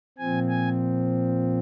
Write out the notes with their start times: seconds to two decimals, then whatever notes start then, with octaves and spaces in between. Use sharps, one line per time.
0.18 A#2 F3 C4 G#5
0.49 G#5